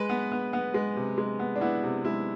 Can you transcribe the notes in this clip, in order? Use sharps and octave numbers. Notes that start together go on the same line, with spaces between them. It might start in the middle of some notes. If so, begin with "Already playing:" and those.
Already playing: G#3 B4
B3
B3
B3
G#3
C3
G#3
B3
D4
B3 E4
C3
G#3 E4